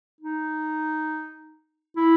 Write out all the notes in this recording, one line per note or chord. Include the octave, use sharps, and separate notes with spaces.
D#4
E4